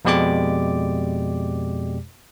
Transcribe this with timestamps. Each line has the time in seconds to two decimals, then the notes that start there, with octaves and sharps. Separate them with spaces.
0.05 F2 B2 G#3 G4 D5 D6